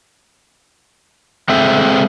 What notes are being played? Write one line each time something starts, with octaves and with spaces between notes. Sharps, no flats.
G#3 C4 G#4 A4 C5 E5